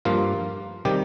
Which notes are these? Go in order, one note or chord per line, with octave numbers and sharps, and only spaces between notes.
G2 F3 A#3 F4
C3 D#3 G3 G4